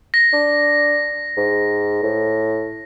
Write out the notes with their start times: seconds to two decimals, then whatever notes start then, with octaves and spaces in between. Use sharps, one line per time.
0.14 A#6
0.33 D4
1.37 G#2
2.03 A2